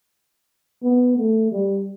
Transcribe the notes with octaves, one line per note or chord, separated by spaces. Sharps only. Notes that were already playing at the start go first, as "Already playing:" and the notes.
B3
A3
G3